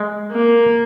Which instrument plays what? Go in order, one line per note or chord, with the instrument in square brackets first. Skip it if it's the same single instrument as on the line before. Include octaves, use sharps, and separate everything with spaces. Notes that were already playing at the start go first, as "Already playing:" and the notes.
Already playing: [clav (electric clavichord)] G#3
[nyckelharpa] A#3